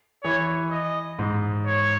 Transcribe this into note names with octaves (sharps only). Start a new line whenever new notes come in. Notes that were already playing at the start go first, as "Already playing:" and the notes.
E3 C#5
D#5
G#2
C#5